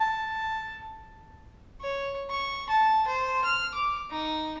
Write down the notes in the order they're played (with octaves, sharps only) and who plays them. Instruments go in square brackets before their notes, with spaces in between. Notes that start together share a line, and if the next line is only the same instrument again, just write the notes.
[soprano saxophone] A5
[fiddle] C#5
C#6
A5
C5
F6
D6
D#4